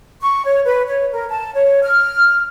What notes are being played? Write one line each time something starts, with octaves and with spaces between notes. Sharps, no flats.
C#6
C#5
B4
C#5
A#4
A5
C#5
F6